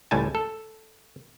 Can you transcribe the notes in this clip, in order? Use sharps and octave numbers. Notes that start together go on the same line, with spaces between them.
C#2 A2 G3 G#5 A5
A4